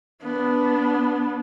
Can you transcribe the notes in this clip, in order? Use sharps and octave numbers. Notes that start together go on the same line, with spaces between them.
B3 D4